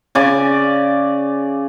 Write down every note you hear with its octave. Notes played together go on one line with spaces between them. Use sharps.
C#3 D5 G#5